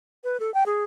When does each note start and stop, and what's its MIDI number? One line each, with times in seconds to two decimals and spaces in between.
0.24 0.39 71
0.40 0.53 69
0.54 0.64 79
0.66 0.84 68